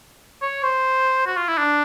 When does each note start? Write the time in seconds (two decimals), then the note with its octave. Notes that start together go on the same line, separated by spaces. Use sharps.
0.42 C#5
0.63 C5
1.27 F#4
1.37 F4
1.48 E4
1.58 D4